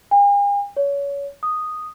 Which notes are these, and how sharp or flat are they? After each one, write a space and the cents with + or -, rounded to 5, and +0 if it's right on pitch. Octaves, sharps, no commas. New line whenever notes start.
G#5 -45
C#5 +25
D#6 -5